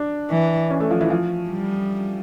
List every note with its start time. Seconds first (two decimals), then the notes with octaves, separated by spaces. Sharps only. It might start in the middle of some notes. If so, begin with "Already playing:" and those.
Already playing: D4
0.31 E3
0.70 C#4
0.80 A3
0.91 F3
1.01 E3
1.10 F3
1.49 G3